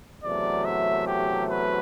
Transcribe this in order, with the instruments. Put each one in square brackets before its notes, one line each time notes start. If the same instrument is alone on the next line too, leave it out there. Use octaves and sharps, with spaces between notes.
[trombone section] E2 C3 F#3 A3 [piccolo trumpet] D5
[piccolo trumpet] E5
G4
B4